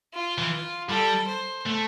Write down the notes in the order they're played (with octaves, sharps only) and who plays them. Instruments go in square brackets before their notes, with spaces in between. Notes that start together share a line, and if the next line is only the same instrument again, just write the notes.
[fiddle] F4
[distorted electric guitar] E3
[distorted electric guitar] G3 [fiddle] A4
[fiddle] C5
[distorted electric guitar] A3